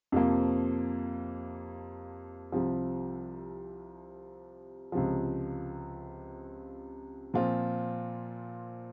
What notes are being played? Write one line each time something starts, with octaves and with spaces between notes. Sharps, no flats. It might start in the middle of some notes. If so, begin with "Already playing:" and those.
F2 C3 F3 A#3
C2 C3 F3
C#2 C3 F3
A#2 F3 C4 F4